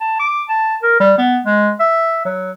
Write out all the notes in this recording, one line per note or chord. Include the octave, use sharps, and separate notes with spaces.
A5
D6
A5
A#4
G3
B3
G#3
E5
F#3